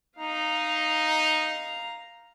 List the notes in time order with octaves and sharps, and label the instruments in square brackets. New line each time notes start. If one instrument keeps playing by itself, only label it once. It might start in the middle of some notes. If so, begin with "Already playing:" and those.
[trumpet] D#4 [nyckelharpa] F5 A#5